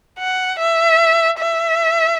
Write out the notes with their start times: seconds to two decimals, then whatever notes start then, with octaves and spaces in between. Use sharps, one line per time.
0.19 F#5
0.59 E5
1.39 E5